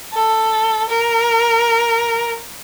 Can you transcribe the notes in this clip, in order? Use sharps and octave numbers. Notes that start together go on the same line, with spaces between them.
A4
A#4